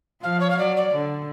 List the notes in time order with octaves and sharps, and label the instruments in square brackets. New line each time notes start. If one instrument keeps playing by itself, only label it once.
[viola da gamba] F3 [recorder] F5
[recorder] C#5
F5
[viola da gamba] F#3 [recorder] D5
[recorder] D5
[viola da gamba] D3